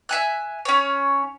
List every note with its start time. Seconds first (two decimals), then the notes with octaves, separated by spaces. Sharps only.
0.09 E5 G#5 F#6
0.65 C#4 C#5